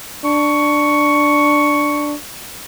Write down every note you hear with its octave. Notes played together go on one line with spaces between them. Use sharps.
D4 C#6